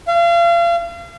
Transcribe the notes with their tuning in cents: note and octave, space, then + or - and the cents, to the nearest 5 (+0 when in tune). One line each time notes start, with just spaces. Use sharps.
F5 -35